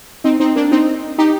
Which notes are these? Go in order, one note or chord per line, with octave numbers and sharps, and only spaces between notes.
C4 D#4
C4 D#4
A#3 D4
C4 D#4
D#4 G4